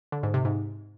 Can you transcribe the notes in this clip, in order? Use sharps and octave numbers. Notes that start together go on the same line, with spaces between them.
D3
G#2
C3
G#2